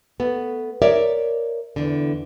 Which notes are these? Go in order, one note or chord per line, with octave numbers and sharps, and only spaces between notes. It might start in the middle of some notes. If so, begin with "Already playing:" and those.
A3 B3
A#4 C#5 D5 E5
E2 D3